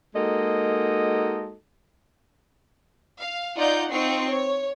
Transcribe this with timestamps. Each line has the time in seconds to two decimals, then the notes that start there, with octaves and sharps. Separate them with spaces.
0.15 G#3 A#3 D#4 F#4 A4 D#5
3.20 F5
3.56 D#4 F4 D5 F#5 A#5 G6
3.90 C4 D#4 F4 C#6 C7
4.29 C#5